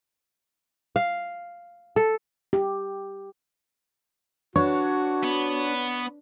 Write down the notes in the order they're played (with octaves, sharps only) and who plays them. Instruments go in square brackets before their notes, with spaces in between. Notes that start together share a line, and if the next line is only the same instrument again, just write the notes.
[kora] F5
A4
[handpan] G4
[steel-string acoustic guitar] D4 [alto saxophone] F#4 [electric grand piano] B4 C#5 C#6
[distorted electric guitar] B3